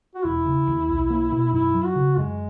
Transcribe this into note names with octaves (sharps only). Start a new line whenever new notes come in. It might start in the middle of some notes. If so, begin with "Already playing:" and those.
F#4
E1 E4
C#3
D#2
B1
A#3
B2
F#2 E4
F#3
F#4
C#3
F#2 G#3